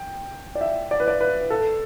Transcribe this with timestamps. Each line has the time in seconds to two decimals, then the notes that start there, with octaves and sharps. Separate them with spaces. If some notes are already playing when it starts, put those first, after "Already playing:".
Already playing: G5
0.55 D5
0.61 E5
0.91 D5
1.00 B4
1.08 D5
1.21 B4
1.50 A4